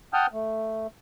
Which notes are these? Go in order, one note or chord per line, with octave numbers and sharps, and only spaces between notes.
F#5 G5 A5 D#6 F6 G6
A3